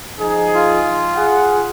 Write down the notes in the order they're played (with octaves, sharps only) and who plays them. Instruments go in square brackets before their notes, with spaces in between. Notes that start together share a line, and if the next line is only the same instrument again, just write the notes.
[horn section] F3 D#4 G#4
[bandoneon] F4
[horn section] G#4 F#5